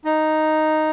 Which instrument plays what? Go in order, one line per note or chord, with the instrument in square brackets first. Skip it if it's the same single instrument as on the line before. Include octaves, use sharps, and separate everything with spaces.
[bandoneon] D#4